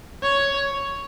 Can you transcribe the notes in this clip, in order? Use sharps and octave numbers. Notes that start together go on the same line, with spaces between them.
C#5